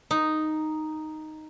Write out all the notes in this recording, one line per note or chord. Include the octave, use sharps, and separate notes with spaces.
D#4